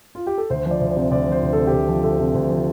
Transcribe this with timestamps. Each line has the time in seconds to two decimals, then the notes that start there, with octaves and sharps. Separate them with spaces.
0.15 F4
0.27 G4
0.38 A4
0.50 D2 C5
0.66 F3
0.71 D5
0.81 D2
0.91 D5
0.97 C3
1.11 D2 D5
1.27 F3 C5
1.43 D2
1.53 C3 A4
1.67 G4
1.73 D2 A4
1.89 F3
2.03 D2 A4
2.19 C3
2.35 D2
2.50 F3